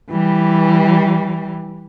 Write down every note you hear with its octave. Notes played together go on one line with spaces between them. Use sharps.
E3 G3